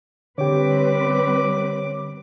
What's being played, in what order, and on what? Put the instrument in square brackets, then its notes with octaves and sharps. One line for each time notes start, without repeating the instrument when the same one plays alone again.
[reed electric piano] D3 G4 [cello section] G3 C4 B4 [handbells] C#5 [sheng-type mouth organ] D6